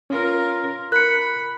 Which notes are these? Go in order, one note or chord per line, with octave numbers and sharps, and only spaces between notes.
C#4 F4 A#4
A#4 B5 F#6 C#7